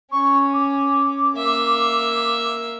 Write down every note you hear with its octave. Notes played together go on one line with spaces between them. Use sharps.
C#4 C#6
D6
A#3 E5